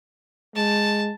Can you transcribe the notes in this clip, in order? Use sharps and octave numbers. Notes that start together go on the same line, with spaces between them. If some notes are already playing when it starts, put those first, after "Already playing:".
G#3 A5